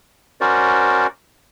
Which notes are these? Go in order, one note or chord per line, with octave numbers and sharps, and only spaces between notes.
C#4 F#4 A#4 C5 D5